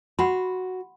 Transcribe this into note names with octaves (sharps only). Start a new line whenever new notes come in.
F#4 F#5 B5 C6